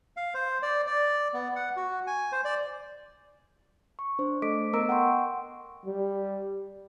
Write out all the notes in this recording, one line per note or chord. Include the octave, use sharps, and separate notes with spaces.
F5
C5
D5
D5
B3
F#5
F#4
G#5
C5
D5
C#6
D4 C5
A3 A4 D#5 D6 B6 D7
B3 A#4 D#5 A#5 E6 D7
F#5 G5 C6 C#6
G3